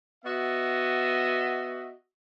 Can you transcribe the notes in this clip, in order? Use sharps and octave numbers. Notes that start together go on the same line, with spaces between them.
B3 F#4 D#5 E5